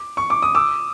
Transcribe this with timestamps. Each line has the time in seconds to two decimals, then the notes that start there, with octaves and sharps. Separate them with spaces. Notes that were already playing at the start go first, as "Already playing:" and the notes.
Already playing: D6
0.17 C#6
0.30 D6
0.42 D#6
0.55 D6 E6